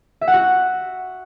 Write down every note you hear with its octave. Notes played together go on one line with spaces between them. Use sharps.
E5
F#5
F#4